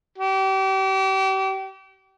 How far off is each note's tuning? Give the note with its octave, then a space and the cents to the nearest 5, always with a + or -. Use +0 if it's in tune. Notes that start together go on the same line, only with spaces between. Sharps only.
G4 -35